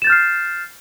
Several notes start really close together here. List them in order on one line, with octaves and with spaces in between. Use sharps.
E7 A6 G6 F6 C7